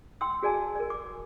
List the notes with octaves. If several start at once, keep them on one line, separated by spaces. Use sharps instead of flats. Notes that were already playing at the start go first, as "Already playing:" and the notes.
G5 C6 E6
F#4 G#4 D5 G#5 A5
A#4 D5
D6